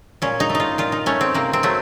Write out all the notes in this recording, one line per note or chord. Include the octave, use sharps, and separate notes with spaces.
A#2 C#4
D#4
A3
D#4
F4
A#2 F4
D#4
A3 C#4
C4
C3 A#3
C4
F#3 A3